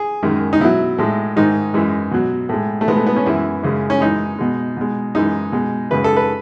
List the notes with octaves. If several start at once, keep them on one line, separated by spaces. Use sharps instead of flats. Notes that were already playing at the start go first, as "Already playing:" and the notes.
Already playing: G#4
F#2 D#3 G#3
D#4
B2 F#3 E4
A2 G#3
G#2 D#3 G#3 D#4
F#2 E3 G#3
B2 F#3
A2 G#3
A3
B2 G#3 B3
A3
B3
C#4
F#2 E3 G#3 E4
F#2 C#3 G#3
C#4
F#2 E3 G#3 D#4
B2 G#3
B2 G#3
F#2 E3 G#3 D#4
B2 G#3
F#2 C#3 G#3 B4
A4
B4